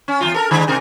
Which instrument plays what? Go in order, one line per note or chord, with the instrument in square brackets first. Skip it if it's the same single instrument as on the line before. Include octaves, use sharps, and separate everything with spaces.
[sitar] C#4
E2 G2 F4
A4 A#4
D3 D#3 G#3
G#2 C3 A#4